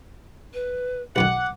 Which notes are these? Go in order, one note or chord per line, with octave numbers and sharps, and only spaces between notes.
B4
B1 F#2 D#3 F#5 D6